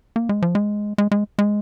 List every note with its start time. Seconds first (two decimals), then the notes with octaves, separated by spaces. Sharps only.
0.16 A#3
0.29 G#3
0.42 F3
0.55 G#3
0.98 G#3
1.11 G#3
1.39 G#3